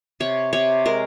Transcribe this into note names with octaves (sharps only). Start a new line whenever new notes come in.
C3 C#5
C3 C#5
G#3 A#4